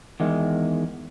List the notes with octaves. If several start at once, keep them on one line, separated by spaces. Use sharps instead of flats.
E2 D#3 G#3